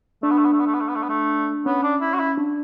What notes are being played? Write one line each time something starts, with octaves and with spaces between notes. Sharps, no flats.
A3 D4
B3
A3
B3
A3
B3
A3
B3
A3
B3
A3
B3
A3
B3 C#4
D4
E4
F#4
E4
D4